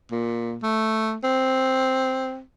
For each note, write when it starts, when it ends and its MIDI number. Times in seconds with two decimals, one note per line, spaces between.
0.11 0.57 46
0.63 1.15 57
1.24 2.41 60